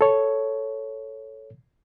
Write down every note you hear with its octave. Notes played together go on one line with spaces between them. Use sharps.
A4 C#5